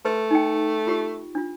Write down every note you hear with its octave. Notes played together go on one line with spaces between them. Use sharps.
A3 B4 C6
D#4 G5
F4 G4
D4 F4